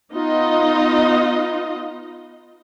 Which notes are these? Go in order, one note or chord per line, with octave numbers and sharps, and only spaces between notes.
B3 D#4 F4 D#5